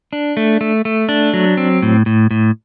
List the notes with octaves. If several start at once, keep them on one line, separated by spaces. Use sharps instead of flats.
D4
A3
A3
A3
D4
F#3
C4
A2
A2
A2